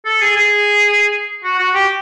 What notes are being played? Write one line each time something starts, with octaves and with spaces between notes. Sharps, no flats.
A4
G#4
G#4
F#4
F#4
G4